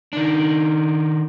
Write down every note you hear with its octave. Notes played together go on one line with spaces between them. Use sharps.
D#3 D4